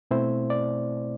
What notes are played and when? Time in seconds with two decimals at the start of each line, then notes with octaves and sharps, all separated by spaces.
0.11 B2 A3 C4 E4 C5
0.50 D5